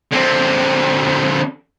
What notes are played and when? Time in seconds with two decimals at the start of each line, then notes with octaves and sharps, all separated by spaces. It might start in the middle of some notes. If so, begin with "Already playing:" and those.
0.12 D3 C4